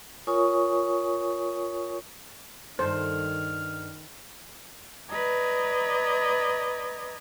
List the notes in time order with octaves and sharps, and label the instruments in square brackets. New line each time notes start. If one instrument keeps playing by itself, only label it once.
[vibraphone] F4 A#4 C#5 G#5 C#6 D#6
[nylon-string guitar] G2 A4 [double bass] D#3 [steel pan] C5 [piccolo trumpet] F6
[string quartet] B4 D5 D#5 A#5 G#6